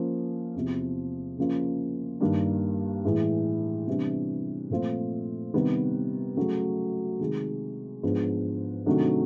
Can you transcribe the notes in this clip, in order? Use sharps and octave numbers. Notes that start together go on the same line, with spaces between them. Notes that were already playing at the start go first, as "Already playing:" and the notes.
Already playing: F3 A#3 C#4
E2 C3 F3
C#3 F3 A#3 C#4 F4
G2 D#3 G3 A#3 D4
A2 E3 G#3
C3 E3 G3 B3 D4
A#2 F3 A3 C4 F4
C3 D#3 G3 B3
C#3 F#3 A3
C3 D#3 G#3
G#2 F3 G#3 B3 D4
C3 D#3 F#3 A3 D4